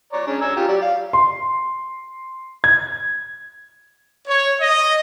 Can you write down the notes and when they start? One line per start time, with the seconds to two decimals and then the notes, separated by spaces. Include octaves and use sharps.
0.13 C#5 D5 A#5
0.27 G#3 C#4 D4
0.41 G#5 A#5 E6
0.56 F4 G4 G5
0.68 F#3 G4 D5
0.82 F5
1.13 C6
2.64 G#6
4.27 C#5
4.61 D#5